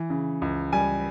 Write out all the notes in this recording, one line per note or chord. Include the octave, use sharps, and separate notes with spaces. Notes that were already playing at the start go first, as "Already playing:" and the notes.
Already playing: E3
C#3
C#2
G3 G#5